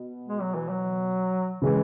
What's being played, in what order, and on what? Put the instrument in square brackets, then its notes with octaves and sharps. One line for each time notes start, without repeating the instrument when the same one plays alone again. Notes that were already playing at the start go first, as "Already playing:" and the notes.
Already playing: [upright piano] B2
[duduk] G#3
F#3
E3
F#3
[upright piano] C#3 G#3 [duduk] E3